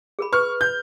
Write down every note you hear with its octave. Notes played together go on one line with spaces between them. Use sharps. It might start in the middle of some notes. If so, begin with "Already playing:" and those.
G#4 A#4 B5
B4 C#6 F6
G6